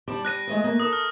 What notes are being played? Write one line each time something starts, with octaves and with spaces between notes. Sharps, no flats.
G3 D5 A5
G3 F#6 A#6 D#7
G#3 A3 D#5
A3 A#3
A4 A#4 D#6
F6